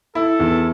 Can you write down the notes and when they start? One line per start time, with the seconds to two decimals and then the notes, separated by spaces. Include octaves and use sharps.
0.15 E4 A4
0.40 E2